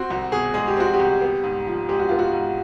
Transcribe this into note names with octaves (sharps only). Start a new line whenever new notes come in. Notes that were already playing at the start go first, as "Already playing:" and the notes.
Already playing: C4 F#4
C2 F#4
B2 G#4
G#3 G#4
G4
C4 F#4
G4
C2
B3
G#2
F3
G#3 G4
F#4
B3 F4
F#4
G#2